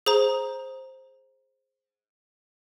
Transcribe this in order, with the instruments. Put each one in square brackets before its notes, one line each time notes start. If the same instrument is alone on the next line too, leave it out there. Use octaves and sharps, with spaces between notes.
[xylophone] G#4 C5 A#5